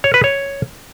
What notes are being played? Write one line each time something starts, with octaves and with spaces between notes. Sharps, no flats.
C#5
B4
C#5